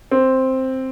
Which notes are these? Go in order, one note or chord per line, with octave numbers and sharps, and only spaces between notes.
C4